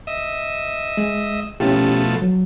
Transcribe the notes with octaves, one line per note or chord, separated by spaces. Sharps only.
D#5 E5
G#3
B2 F3 A3 C#4 E4 G4
F#3